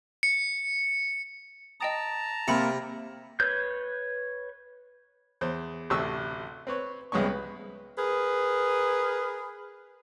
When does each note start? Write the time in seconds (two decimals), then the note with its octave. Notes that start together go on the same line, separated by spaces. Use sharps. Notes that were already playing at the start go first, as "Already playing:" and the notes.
0.23 C#7
1.81 D#5 G5 A5 A#5 D#6
2.48 C3 A#3 B5 C#7
3.40 B4 C#5 G6
5.41 E2 C5
5.90 A1 D2 C3 C#6 E6
6.67 C4 B4 C#5
7.12 C2 G#3 B3 C#4 C#6
7.27 B4
7.97 G#4 A#4 B4